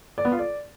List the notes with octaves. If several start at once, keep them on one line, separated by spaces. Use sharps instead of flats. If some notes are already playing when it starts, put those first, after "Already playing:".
D5
B3
F4
D5